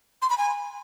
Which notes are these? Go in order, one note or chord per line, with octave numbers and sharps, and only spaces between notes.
C6
B5
G#5